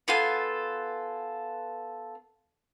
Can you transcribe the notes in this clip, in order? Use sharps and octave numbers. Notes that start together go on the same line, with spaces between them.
B3 F4 A4 G#5